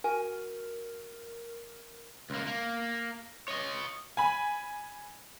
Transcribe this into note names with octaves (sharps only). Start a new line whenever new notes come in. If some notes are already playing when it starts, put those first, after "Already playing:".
F#4 A#4 G#5
C#2 A#3
A#3
C#5 D#5
G#5 B5